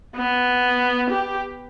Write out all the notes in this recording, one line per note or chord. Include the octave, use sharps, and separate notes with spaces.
B3
G4